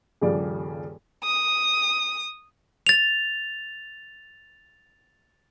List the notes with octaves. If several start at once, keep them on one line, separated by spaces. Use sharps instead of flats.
D#1 G2 C#3 F3 D5
D#6
A6 F7